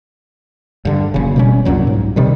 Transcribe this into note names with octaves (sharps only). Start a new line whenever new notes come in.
G2 D3
F#1 C#3
B2 G3 C#4
C2 F#2 A#2 F#3
G#2
C3 D#3 G3